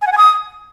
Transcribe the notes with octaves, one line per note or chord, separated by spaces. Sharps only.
G#5
F#5
G#5
D#6